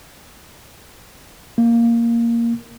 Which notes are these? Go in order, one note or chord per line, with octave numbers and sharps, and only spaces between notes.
A#3